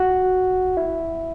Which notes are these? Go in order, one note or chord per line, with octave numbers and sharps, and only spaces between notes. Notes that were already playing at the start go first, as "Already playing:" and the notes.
Already playing: F#4
E4